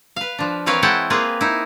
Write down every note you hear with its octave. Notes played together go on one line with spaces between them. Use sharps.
B4 F5
F3 D4
E3 C4 A#4 B4 C#5 F5
G#3 E4 F#5 G5 A5
A#3 C4 F4 G#4 B4
D#4 E4